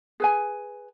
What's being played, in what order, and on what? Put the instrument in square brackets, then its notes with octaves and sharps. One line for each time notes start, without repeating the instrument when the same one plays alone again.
[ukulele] G#4 B4 G#5